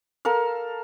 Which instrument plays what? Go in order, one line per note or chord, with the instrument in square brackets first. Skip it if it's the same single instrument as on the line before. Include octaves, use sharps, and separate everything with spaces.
[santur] A4 A#4 F5